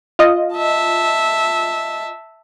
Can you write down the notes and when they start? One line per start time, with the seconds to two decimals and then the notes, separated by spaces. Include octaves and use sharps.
0.19 F4 D#5
0.55 E5 A5